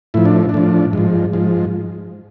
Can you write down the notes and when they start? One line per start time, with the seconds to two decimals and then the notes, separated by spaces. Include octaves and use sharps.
0.14 A2 F3 E4
0.25 D4
0.49 D4
0.54 A2 F3
0.93 G#2 F3
1.33 G#2 F3